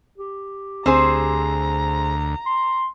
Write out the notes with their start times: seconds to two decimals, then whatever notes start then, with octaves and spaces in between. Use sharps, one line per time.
0.18 G4
0.86 D2 C4 G#4 C5 A#5
2.46 C6